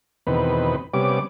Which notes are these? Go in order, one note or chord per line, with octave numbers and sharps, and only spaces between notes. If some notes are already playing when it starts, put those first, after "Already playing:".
E2 B2 D#3 C4 B4
C3 G3 B3 C#4 D6